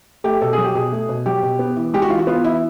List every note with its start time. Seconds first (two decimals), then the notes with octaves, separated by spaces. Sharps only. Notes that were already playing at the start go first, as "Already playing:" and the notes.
0.24 A3 G4
0.41 B2 A4
0.53 F#3 G#4
0.64 G4
0.75 B2 G#4
0.92 A3
1.09 B2
1.26 F#3 G4
1.43 B2
1.59 B3
1.77 E3
1.94 G#3 G4
2.02 F#4
2.10 E3 F4
2.19 F#4
2.27 B3 F4
2.44 E3 E4